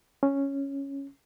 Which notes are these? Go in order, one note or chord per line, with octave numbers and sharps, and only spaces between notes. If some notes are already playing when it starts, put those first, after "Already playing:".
C#4